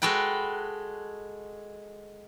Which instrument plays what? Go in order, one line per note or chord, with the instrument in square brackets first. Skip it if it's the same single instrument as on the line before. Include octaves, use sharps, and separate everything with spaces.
[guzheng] G#3 F#4 A4 B4 G5